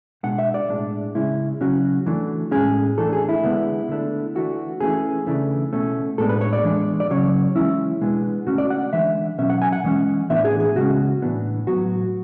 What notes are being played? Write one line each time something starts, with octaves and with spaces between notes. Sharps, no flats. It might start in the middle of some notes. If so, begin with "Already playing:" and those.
B2 G#3 D4 F#5
E5
D5
A2 G#3 D4
C#3 G#3 C#4 E4
C#3 F#3 C#4 F#4
E3 A3 D4
A2 G#3 C#4 G#4
E3 A3 D4 A4
G#4
E4
D3 G#3 B3 D4
D3 A3 D4
E3 A3 D4 F#4
E3 A3 C#4 G#4
C#3 E3 A3 D4
B2 A3 C#4
A2 G#3 B3 D4 A4
B4
C#5
D5
E3 G#3 D4
D5
C#3 F#3 C#4 C#5
E3 G#3 C#4 E4
B2 G#3 B3 D4
D3 A3 C#4 F#4
D5
F#5
E3 G#3 D4 E5
B2 F#3 C#4 E5
F#5
G#5
F#5
E3 G#3 C#4
A2 E3 B3 D4 E5
G#4
G#4
C#3 G#3 C#4 F#4
A2 E3 B3 D4
A2 F#3 B3 F#4